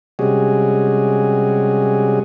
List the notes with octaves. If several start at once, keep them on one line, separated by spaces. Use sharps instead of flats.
C3 G3 G#3 C#4 F#4 G#4